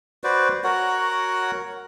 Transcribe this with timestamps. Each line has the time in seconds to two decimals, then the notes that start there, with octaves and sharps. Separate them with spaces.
0.24 F#4 B4 C5 D5
0.64 F#4 A#4 C#5 F#5